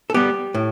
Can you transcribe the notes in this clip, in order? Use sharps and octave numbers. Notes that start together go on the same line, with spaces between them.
A4
G3 B3 G4
A2